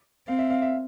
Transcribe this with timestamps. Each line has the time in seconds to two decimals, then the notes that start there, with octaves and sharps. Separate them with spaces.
0.28 C4 F5
0.39 E5
0.50 F5
0.62 E5